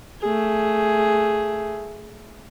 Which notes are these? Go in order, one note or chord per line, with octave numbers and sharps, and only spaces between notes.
A3 G#4